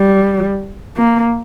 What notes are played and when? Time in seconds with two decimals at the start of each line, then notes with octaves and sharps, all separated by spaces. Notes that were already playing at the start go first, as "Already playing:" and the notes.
Already playing: G3
0.97 A#3